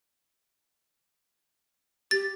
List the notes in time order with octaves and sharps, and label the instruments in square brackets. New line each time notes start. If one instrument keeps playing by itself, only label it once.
[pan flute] G4 [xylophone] A6